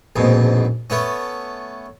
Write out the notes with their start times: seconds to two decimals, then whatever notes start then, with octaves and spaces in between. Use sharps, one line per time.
0.16 A#1 F2 G#2 B2
0.90 A3 B3 C#4